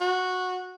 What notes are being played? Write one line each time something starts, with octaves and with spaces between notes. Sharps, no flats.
F#4